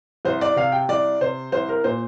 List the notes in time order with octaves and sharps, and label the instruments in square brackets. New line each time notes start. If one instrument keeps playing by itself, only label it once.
[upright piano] C2 C5
D5
C3 F5
G5
C2 D5
C3 C5
C2 C5
A#4
A#2 C5